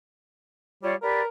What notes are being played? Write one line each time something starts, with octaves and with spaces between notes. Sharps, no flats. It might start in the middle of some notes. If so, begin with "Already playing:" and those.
G3 F4 C#5 D5
G4 A#4 B4 D5